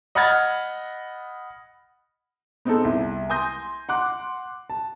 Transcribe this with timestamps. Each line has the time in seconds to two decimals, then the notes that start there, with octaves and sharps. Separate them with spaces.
0.15 D#5 F#5 B5 F6 G#6 A6
2.65 B3 C4 D#4 G#4 A4
2.85 C2
3.30 G#5 C6 D#6 G6 A#6
3.89 F#5 C6 D6 F#6
4.70 A5